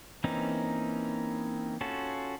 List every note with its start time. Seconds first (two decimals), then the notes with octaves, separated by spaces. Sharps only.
0.24 E3 A#3 C4 C#4 D#4
1.81 C#4 F4 F#4 A4